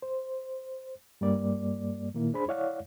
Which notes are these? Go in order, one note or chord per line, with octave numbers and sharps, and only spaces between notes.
C5
G2 G3 A#3 D5
A#2 D#3 A#3 E4
D4 G#4 C5 B5
E4 C#5 D5 F5 F#5